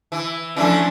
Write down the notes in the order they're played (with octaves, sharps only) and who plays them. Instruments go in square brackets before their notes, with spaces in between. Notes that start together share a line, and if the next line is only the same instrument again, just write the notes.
[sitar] E3
[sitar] E3 A3 [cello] F3 [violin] C#4 D4